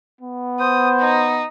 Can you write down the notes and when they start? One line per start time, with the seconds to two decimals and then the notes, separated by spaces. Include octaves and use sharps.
0.21 B3
0.60 C5 D#6
0.99 D#4